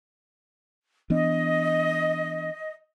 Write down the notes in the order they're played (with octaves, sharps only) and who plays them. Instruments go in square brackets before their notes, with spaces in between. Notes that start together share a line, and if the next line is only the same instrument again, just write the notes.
[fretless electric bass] E3 B3 D4 [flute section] D#5